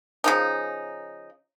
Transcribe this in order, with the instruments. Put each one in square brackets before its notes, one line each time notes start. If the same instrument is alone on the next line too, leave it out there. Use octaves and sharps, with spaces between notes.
[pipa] C#3 F3 D#4